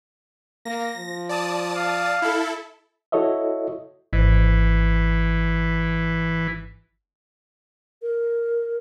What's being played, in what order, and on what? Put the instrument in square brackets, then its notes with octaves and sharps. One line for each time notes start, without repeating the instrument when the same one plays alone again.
[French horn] A#3 [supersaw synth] A#6
[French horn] F3
[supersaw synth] D5 A5 D#6
[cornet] F5
[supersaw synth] E4 A4
[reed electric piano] E4 F#4 A4 C#5 D#5 E5
[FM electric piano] G#1 [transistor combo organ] E3
[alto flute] A#4